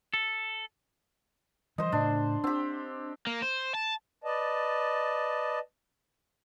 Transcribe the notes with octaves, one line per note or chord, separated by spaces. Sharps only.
A4
E3 F3 G3 C5 D#5
A2 C#3 D4
C4 D4 G4
A#3
C5
A5
B4 D5 D#5 A5